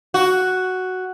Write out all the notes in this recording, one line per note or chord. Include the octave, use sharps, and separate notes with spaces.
F#4